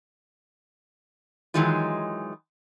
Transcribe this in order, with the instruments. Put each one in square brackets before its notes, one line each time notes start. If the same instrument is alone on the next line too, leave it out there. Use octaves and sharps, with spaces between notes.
[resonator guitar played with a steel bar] D#3 E3 F#3 G#3 D#4 F4